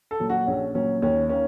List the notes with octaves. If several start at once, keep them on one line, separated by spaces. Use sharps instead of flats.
A4
A#2 F#3
F#4
A#1 C#4
A#2 F#3 C#4
D#2 C#4
D#3 A#3 C#4